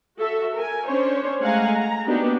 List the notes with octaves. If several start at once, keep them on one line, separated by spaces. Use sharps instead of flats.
F#4 A4 E5
A#4 G#5
C#4 D4 C5 C#5
G#3 A3 F5 F#5 G#5 A#5
A#5
A#3 B3 D4 D#4 F#4 G4